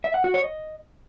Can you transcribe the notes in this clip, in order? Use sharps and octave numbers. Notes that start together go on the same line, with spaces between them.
E5
F#5
F#4
C#5
D#5